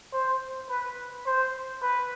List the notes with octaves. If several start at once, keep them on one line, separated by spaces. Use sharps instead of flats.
C5
B4
C5
B4